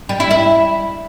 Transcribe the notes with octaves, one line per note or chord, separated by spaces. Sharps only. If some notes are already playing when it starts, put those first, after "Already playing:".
G3
E4
E4